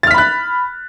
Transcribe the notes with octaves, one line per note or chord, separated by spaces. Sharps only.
B5 F6 F#6 A6 B6